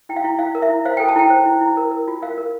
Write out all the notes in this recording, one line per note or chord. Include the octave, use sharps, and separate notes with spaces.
E4 G5
F5
E4
E4 F5
A#4
E5
E4
C5 F5
A4 G5
A5
E4 G5
C5
E4
E4
A#4
A#4
F4
A#4 F5
A#4